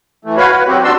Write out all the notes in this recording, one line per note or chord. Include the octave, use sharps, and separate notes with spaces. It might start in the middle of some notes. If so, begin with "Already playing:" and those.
E3 A3
F#4 B4 C#5 F5 B5
B4
F#3 C4 F#4 G4
D#2 D4 F#4 D5 C6 E6